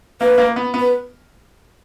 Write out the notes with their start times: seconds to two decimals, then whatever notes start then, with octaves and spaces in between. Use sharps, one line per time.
0.21 A#3 B4
0.38 A#3
0.56 B3
0.74 B3
0.79 B4